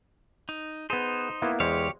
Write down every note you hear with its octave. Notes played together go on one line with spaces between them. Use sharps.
D#4
B3 D#4 G#4 C5
A#3 B3 E4
E2 G#3 G4 C5 C#5 F5